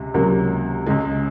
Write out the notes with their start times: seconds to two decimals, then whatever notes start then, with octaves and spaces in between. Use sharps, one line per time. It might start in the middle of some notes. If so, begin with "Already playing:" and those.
Already playing: C#2 C3
0.14 C#2 C3 F#3 A#3
0.87 C#2 C#3 G#3